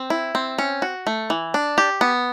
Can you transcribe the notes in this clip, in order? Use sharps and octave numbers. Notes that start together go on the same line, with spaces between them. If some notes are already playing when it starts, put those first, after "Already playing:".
Already playing: C4
E4
C4
C#4
F#4
A3
E3
D4
G4
B3